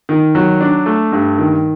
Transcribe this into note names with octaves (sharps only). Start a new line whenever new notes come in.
D#3
F#3
D4
A3
G2
D#3